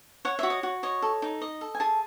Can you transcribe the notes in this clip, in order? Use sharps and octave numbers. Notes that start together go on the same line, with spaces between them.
C#5 F#5
F#4 E5
D#5
F#4
C#5 D#5
A4
D#4
D#5
A4
G#5
G#4 A5